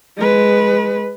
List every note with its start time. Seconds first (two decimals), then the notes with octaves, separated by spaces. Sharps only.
0.17 G#3 B4